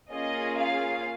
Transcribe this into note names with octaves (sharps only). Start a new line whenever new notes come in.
A#3 C#4 F4 G#4 D#5
F5